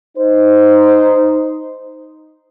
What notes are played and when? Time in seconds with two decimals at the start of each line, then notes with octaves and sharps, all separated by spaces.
0.17 D#4 C5